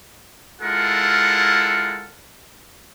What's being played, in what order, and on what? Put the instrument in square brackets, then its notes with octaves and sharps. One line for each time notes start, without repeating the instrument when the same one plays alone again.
[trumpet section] G#3 E4 F4 A4 A#4 F#5